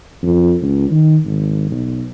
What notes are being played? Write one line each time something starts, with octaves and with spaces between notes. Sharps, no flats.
F2
C#2
D#3
G#1
B1